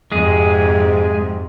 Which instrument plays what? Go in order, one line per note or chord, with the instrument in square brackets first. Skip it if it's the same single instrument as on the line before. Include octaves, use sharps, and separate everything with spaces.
[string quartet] F2 G#2 C3 [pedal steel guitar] G#3 G#4